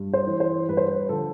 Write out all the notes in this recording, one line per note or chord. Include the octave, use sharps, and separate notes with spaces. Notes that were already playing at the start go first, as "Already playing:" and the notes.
Already playing: G2
C5
E3
C5
G2 B4
C5
B4
D3 F3 A4